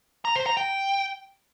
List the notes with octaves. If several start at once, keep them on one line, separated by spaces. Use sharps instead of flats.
A#5
C5
A#5
G5